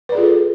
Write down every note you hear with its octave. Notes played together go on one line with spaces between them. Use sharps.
F4 G#4 A4 B4 D5